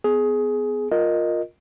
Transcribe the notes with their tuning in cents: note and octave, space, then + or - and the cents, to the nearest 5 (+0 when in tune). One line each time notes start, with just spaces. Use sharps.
B3 +25 G#4 +15
F4 +15 A#4 +0 D#5 -5